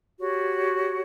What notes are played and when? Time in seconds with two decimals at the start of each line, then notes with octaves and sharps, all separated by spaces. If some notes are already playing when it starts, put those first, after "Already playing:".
0.20 F#4 G4 C#5